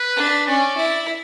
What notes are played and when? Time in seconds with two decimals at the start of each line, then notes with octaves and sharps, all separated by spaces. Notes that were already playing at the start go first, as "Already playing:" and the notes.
Already playing: B4
0.17 D4
0.46 C#4 D5
0.77 E4